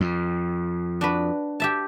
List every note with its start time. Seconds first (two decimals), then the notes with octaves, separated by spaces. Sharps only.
0.01 F2
1.01 D4 F#4 B4
1.60 G4 E5 A5